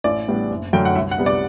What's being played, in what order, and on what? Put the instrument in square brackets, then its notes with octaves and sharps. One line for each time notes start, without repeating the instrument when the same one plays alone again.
[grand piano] A1 D5
A2 G3 B3 D4
F#1
F#2 D3 A3 G5
F#5
C2 E5
F#5
C3 G3 B3
D5